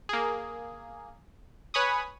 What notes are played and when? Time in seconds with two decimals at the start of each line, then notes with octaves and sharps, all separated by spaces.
0.09 A#3 G#4
1.74 B4 C#5 G#5 B5 C#6 D#6